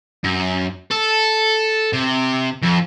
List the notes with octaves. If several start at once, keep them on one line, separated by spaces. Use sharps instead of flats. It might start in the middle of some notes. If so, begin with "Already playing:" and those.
F#2
A4
C3
F2